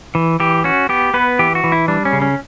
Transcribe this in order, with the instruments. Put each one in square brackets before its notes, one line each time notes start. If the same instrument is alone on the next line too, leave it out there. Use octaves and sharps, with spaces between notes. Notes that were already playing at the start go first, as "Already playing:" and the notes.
[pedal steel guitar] E3
E3 G4
C#4 F#4
B3 G4
B3 B4
E3 G4
F#4
E3
E4
G3 D4
C#4
C#3
C#4